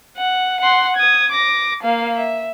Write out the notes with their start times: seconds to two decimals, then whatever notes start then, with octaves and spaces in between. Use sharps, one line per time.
0.17 F#5
0.60 F#5 C6
0.97 D#6 G#6
1.32 D6 A#6
1.83 A#3 F5
2.18 E5